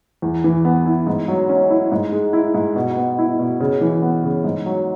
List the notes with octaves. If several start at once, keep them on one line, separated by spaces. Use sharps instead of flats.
E2
E3
B3
E4
G#2
F#3
C#4
E4
G#2
G#3
E4
G#2
B2
B3
E4
B2
C#3
E3
B3
C#3
G#2
F#3